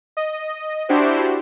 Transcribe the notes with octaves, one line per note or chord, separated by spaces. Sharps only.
D#5
D4 E4 F#4 G4 C5